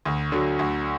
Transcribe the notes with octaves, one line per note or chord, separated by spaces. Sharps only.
D2
D3 F#3
D2